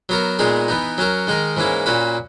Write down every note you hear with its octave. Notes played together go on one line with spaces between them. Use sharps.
F#3 B3 F#4 A#4
A#2 G#3 B3 D#4 G#4
E3 B3 D#4
F#3 C#4 F#4 A#4
D#3 G#3 D#4 A#4
G#2 E3 A#3 C#4 E4
A#2 A#3 C#4 F#4 B4